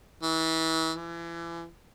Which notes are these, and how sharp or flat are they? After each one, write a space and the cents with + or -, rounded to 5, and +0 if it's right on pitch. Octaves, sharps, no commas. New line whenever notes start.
E3 -30
E3 +35